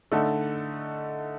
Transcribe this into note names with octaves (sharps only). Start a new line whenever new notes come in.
D3 A3 D#4 A4